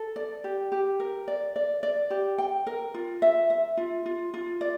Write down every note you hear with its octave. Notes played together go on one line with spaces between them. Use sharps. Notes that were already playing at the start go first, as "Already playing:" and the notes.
Already playing: A4
D5
G4
G4
A#4
D5
D5
D5
G4
G5
A#4
F4
E5
E5
F4
F4
F4
D5